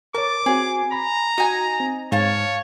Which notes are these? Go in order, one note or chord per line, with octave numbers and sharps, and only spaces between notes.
A#4 C#5 A5 D6
C4 F#4 G#4
A#5 B5
D#4 F#4 G#5
C4
G#2 C#5 F5 A5